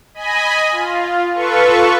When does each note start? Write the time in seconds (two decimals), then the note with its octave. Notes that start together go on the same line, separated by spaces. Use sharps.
0.14 D#5 G#5 B5
0.72 F4
1.34 F4 A4 B4 C#6